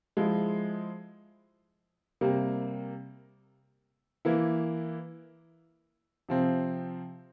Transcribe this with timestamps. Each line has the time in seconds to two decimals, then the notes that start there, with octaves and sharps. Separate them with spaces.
0.17 F3 G#3 E4
2.21 C3 G3 A#3
4.25 E3 A#3 E4
6.29 C3 F3 C4